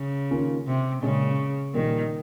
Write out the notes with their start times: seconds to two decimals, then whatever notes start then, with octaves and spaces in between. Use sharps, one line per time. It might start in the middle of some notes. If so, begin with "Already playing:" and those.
Already playing: C#3
0.31 D#3 A#3 C#4 F4
0.67 C3
1.02 A#2 C#3 G#3 C#4
1.74 A#2 D#3 G3 A#3